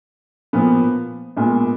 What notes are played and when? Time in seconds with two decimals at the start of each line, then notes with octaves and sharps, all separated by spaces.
0.53 A#2 F3 B3
1.37 A#2 G#3 B3